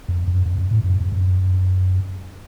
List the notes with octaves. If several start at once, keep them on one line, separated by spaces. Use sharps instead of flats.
F2
F2
F#2
F2
F#2
A2
F#2
F2
F2
F#2